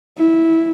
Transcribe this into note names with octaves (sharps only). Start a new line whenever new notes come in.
E4